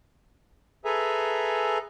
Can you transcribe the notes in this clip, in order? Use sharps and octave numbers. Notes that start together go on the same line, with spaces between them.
G#4 A4 B4 E5 G#5 A#5